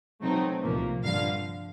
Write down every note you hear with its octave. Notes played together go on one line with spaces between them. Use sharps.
B2 F#3 A3 C4 D#4
C2 A#2 F3 A#3
G2 D3 F3 F5